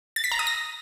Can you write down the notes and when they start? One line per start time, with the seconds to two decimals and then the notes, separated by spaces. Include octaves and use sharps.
0.16 A6
0.24 B6
0.32 A#5
0.39 D#6
0.47 A#6